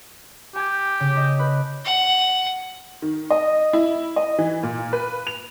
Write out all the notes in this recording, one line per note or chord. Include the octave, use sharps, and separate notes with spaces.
G4 G#5 G#6
C#3
D#5 A5
B4
F#5
D#3
D#5
E4
D#5
E3
A#2
B4
F7